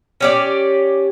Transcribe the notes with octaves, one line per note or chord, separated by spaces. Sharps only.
C#4 G4 D5